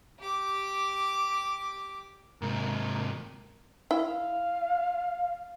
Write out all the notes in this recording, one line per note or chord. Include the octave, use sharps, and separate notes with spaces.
G4 D6
G#2 C3 A#4
E4 E5 F5